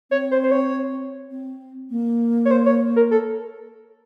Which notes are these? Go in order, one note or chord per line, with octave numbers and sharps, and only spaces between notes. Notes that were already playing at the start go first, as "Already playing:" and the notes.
C4 C#5
C5
C5
C#5
C4
A#3
C#5
C5
C#5
A#4
A4